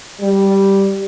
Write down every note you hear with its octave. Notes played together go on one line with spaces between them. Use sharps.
G3